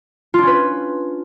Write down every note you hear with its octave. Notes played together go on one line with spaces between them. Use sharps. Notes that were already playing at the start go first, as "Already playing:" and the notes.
C#4 D4 F4 B4